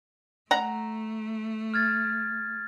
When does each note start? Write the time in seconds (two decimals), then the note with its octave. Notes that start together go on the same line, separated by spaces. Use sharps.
0.51 A3 F#5 A#5
1.74 F6 G#6 A6